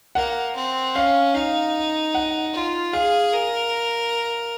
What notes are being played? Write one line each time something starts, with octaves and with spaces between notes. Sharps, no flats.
A#3 F#5
C4
C#4 F5
D#4 F5
F#5
F4
G#4 F5
A#4